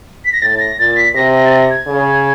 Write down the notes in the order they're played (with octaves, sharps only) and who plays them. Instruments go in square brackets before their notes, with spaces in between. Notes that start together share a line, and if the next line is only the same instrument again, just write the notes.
[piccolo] B6
A#6
[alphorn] A2 [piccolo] A6
[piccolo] A#6
[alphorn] A#2 [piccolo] A6
[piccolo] B6
[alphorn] C3 [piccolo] A#6
[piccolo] A#6
A6
A#6
G#6
[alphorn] C#3